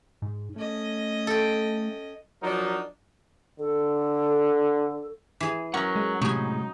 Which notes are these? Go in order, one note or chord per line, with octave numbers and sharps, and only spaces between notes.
G#2
A3 C#4 D#5
A4 G5
F3 F#3 D4 D#4 A#4
D3 A4
E3 G#4
F#3 C#4 A#4 F#5
G#3
A2 C3 F#3 G#3 D#4 G#5